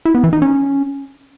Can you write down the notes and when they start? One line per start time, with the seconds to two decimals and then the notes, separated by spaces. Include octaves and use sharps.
0.05 E4
0.15 B3
0.24 E3
0.33 D#4
0.42 C#4